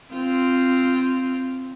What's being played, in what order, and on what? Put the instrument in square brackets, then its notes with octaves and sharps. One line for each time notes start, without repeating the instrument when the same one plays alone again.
[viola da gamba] C4 F4